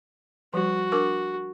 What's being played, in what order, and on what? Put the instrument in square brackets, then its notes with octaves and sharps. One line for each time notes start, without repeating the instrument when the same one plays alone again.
[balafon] F3 G3 [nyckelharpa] F#4
[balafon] D4 A#4 D6